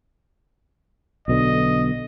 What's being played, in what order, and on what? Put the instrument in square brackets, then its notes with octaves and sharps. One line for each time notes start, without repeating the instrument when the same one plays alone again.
[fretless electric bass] B1 B2 D3 [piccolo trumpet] D#5